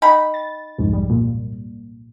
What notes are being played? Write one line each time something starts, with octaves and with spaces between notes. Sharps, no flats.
D#4 G5 B5
A6
C2 F2 G#2
G3
A#2